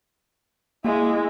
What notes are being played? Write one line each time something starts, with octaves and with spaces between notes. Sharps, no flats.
G#3 A#3 E4